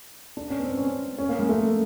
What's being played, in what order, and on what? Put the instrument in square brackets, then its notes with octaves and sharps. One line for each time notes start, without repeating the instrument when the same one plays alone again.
[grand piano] D4
C#4
B3
C4
C#4
C#4
A#3
G#3
A3